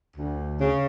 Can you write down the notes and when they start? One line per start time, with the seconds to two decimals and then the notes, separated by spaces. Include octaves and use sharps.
0.17 D2
0.60 C#3